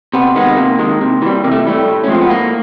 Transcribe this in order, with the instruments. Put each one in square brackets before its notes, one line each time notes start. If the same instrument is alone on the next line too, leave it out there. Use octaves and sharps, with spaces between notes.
[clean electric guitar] C3 B3
D#3 G#3 B3
C3 A#3
D#3 G#3
C3
E3 G3
C3 A#3
A3
E3 G3 A3
A2
C#4
F3 G#3 C4
B3
A2 A#3